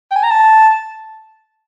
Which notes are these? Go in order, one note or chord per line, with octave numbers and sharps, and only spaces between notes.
G5
G#5
A#5
A5